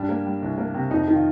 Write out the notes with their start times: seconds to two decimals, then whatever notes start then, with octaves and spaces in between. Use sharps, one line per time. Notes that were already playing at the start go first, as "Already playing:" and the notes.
Already playing: G2 G3 D4
0.09 A#3
0.26 G3
0.42 C2
0.58 A#3
0.74 C3
0.91 F2 D#4
1.08 D#3
1.15 F4